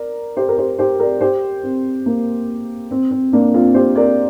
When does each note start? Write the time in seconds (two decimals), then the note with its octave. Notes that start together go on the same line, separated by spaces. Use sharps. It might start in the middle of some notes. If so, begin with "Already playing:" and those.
Already playing: A#4 D5
0.37 G4 C5
0.49 A#4
0.58 G4 C5
0.79 G4 C5
0.99 A#4 D5
1.21 G4 C5
1.63 C4
2.06 A#3
2.91 C4
3.11 C4
3.32 A#3 D4
3.54 C4 F4
3.74 G4 C5
3.96 A#4 D5